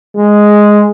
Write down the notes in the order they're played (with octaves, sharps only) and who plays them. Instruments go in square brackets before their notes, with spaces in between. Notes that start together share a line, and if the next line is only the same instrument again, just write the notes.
[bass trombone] G#3